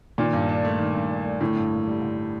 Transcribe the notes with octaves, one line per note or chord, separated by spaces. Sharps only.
A#2 D#3
G2
D4
A3
D#3
G2
D4
A3
A2 D3
G2
A#3
G3
D3